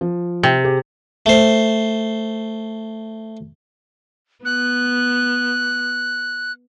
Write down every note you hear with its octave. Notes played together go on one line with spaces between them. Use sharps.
F3
C3
G4 G#4
A3 C5
B3 F#6